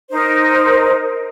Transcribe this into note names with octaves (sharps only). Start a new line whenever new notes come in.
D#4 A#4 C5